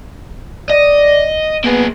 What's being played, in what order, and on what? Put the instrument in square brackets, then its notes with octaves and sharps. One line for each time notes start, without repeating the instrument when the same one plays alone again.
[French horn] D5 [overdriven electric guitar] D#5
[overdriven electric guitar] A#3 G#4 [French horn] B3